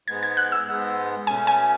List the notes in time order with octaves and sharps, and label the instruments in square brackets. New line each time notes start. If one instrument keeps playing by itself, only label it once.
[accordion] G#2 G#3 B3 [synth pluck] G#6
[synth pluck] G#6
F#6
E6
[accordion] G#2 G#3 B3
[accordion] B2 A3 C#4 [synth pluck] G#5
[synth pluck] G#5